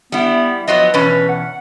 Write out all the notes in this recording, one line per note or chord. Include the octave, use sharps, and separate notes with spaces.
G3 B3 E4
F3 F#3 B3 D#5
E2 B2 C#4 B4
F#5